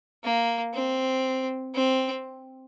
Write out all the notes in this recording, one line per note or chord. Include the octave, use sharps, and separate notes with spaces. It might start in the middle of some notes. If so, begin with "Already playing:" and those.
A#3
C4
C4